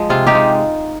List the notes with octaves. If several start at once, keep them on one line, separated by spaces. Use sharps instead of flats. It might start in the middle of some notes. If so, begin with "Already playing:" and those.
Already playing: F3 G#3
C3 F4 G#4
D#4 G4
G#3